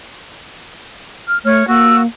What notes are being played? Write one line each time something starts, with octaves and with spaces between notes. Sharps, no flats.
F6
A3 C#5 F6
A#3 F#4 E6